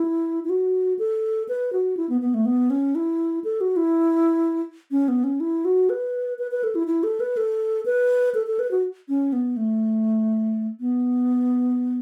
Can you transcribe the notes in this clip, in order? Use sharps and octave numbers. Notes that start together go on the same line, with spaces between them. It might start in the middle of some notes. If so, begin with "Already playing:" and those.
Already playing: E4
E4
F#4
A4
B4
F#4
E4
B3
B3
A3
B3
C#4
E4
A4
F#4
E4
C#4
B3
C#4
E4
F#4
B4
B4
B4
A4
E4
E4
A4
B4
A4
B4
A4
A4
B4
F#4
C#4
B3
A3
B3